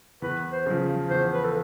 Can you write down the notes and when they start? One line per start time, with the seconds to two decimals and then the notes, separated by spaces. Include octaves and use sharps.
0.22 E2 B4
0.52 C5
0.66 C#3 F3
1.10 E2 C5
1.32 B4
1.45 A4